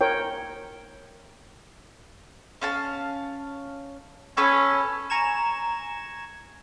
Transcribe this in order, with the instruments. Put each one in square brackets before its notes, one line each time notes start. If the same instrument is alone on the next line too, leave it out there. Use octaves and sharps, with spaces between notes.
[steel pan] A#4 C#5 G5
[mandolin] C#4 F5 A5
[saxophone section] C#4 [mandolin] A4 B4 G#5
[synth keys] G#5 A#5 C#6 G#6 E7